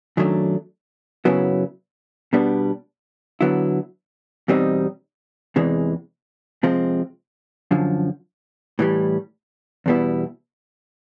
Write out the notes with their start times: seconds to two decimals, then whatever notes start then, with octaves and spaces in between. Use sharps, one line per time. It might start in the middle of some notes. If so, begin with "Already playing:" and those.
0.17 F#2 D#3 F#3 A3 D4
1.25 F#2 C#3 F#3 B3 E4
2.33 B2 G3 B3 D4
3.41 D3 F#3 B3 E4
4.48 E2 B2 G3 C4 D#4
5.56 E2 C3 E3 G#3
6.63 C3 F3 G#3 C4
7.71 F#2 D3 F3
8.79 A2 E3 G3
9.86 E2 B2 G3 B3 E4